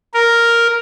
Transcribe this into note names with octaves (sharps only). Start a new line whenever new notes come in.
A#4